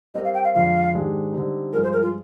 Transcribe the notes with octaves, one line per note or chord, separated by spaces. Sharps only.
G3 C4 G4 A#4 D#5
F5
G5
F5
F2 D3 F3 G#3 F5
G#2 D#3 G#3 D4 G4
D3 G3 C4 D#4
G2 F3 G#3 A#4
C5
A#4
F4